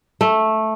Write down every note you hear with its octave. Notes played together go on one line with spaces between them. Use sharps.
A3